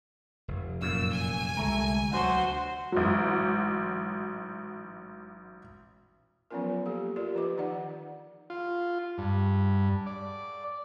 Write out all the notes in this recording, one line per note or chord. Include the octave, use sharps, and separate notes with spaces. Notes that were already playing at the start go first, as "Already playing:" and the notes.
F1
F#2 A#2 F5 E6
G#5
C2 D3 G#3 A3 A#5
D2 F#3 D4 F#4 C5
A1 G#2 F#3
F3 F#3 B3 C#4 F4 A#4
A#3 G4 A4
F4 G4 A#4 D5
F3 G4 D#5 D6
D#3 D#4 D5 F#5
F4
G2
D5